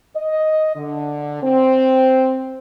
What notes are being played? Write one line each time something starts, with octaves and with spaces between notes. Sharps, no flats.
D#5
D3
C4